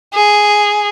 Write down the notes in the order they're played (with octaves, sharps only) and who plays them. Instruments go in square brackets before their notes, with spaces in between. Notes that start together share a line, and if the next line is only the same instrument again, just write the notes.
[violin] G#4